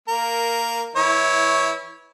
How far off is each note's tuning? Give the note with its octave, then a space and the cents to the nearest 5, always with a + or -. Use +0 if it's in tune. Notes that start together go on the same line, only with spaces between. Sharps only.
A#3 -10 A#4 +0
E3 -5 E4 -20 C#5 +0